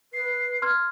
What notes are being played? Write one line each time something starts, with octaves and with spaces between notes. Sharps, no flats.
B4 C7
C6 F6 G#6